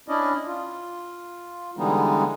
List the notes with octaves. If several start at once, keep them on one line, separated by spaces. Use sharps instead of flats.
C#4 D4 E4 D5 D#5
F4
D3 E3 G3 G#3 B3 D#4